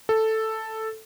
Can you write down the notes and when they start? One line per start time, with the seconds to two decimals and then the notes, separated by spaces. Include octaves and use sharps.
0.09 A4